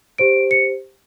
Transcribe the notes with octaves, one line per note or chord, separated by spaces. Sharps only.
G4 C5 D7
C#7